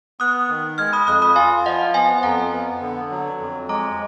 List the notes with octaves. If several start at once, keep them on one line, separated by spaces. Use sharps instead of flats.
B3 D#6 F#6
D#3
G#3 F6 G#6
B5 D#6
F2 D#6 F#6
B5 D#6
F4 F5 G#5
F3 D#5 F#5
B3 F5 G#5
G#5
F2 F#5 A#5
B3
D3
F#3
F2
G#3 A#5 D6